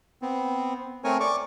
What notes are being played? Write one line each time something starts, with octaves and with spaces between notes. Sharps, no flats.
B3 C4
A3 C4 A#4 C#5 G#5
D5 C#6 D6